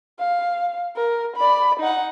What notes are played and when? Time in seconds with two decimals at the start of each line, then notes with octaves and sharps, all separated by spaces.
0.19 F5
0.97 A#4
1.36 D5 B5
1.80 D#4 F#5